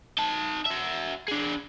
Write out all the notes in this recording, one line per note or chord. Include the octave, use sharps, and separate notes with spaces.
D#4 A5
F#4 E5
D4 G#4